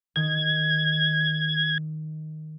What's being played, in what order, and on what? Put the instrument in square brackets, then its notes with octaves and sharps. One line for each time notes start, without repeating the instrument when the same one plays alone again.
[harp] D#3 [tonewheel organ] G#6